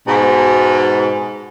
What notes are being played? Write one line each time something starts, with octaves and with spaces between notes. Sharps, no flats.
G#2 B2